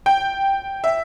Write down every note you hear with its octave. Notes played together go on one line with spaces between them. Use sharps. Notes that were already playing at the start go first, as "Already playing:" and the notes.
G5
E5